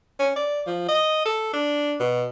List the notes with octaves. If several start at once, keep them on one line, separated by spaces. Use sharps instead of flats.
C#4
D5
F3
D#5
A4
D4
B2